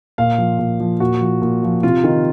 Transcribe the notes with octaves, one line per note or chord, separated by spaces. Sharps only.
A#2 F5
F3
A#2
F3
A#2 F#4
F3
A#2
F3
C3 F4
D#3